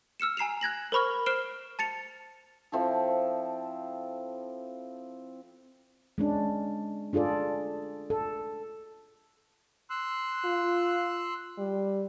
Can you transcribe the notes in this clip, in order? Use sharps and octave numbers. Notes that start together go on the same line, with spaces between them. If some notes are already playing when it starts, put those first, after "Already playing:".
E6 F6 C#7 E7
G#5 A#5 C7 E7 F7
F#6 G#6 A#6 F#7
A#4 C5 B5 C#6 F6
C5 F6 C7 D7 E7 G7
A5 A6 C#7 F7
F3 C4 E4 A4
G#3 C#4 D4
D4 F4 G#4 A4 D5
A4
C6 E6 F#6
F4
G3